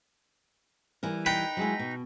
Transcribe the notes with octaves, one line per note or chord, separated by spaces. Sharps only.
E3 G3 A#4
D#4 B4 G5
F#3 G#3 E4
B2